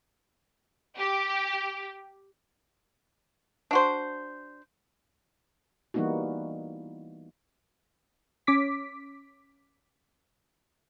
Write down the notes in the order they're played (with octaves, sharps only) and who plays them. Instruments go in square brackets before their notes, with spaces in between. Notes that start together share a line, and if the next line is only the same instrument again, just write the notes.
[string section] G4
[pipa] D4 F#4 C5
[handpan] E3 G3 A#3 B3 D#4 F#4
[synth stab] C#4 D6 B6